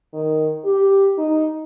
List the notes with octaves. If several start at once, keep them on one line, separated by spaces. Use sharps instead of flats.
D#3
G4
D#4